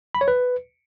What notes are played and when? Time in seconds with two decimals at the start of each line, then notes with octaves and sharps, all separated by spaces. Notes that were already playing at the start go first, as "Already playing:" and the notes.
0.15 B5
0.21 C#5
0.28 B4